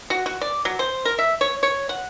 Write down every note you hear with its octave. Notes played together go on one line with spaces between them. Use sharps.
F#4
F#4
D5
F#3
C5
A#4
E5
C#5
C#5
F#5